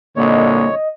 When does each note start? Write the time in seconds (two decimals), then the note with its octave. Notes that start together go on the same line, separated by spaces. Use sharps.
0.16 C2 A#2 D3 A#3 C#5 D#5